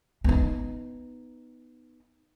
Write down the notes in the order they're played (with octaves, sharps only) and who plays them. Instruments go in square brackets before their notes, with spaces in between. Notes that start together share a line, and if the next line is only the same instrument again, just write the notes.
[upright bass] B3 D#4